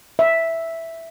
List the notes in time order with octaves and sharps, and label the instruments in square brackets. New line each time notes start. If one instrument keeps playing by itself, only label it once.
[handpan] E5